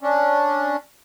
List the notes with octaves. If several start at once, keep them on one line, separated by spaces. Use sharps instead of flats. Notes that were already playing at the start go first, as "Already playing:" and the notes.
C#4 D4